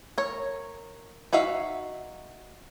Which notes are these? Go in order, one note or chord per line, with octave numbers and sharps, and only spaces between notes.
A#4 C#5
D#4 F#4 E5 F5